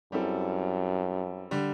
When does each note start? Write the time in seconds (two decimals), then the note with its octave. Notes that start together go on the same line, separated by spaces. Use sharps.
0.12 F#2 G3 C4 E4 A4
1.51 D3 G3